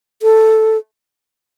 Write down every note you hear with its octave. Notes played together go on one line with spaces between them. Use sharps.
A4